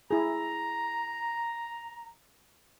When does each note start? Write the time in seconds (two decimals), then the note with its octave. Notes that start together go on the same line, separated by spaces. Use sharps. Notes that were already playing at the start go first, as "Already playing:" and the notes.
0.11 E4 G#4 A#5